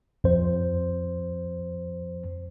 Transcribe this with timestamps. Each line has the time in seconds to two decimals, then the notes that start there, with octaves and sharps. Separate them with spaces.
0.24 F2 C5